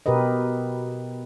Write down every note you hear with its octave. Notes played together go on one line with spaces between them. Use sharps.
B2 G4 A#4 B4 D#5